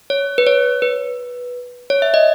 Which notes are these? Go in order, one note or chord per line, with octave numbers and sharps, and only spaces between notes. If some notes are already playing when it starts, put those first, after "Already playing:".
C#5
B4
C#5
B4
C#5
E5
D#5